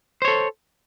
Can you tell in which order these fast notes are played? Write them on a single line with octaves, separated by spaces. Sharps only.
C5 C#5 A4